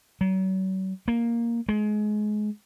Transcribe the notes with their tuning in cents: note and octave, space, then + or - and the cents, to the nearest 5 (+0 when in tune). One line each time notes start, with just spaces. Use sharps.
F#3 +40
A#3 +5
G#3 +25